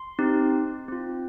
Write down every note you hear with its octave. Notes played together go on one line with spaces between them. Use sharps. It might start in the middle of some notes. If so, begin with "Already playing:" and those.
Already playing: C6
C4 D#4 G4
C4 F4